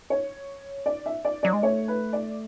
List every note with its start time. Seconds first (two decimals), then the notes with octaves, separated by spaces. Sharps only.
0.10 C#5
0.86 D5
1.06 E5
1.25 D5
1.43 F#3 D5
1.53 G#3
1.63 A3 C#5
1.88 B4
2.13 D5